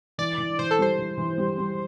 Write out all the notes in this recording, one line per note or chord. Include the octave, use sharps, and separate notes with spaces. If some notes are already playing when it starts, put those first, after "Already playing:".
E3 D5
E3
E3 C5
A4
G3 C5
E3
E3
G3
G3